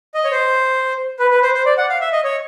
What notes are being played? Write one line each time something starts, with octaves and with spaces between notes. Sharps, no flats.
D#5
C#5
C5
B4
B4
C5
C5
D5
F#5
F5
E5
D#5
C#5